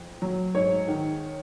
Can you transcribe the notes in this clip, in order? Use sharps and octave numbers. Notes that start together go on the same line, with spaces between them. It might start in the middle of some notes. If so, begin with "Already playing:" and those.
Already playing: F2
F#3
G#2 C#5
D#3